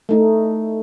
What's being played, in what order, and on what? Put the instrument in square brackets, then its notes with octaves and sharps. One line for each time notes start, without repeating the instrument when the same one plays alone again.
[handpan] A3 D#4